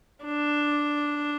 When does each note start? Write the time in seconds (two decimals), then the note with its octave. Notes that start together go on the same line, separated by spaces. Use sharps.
0.25 D4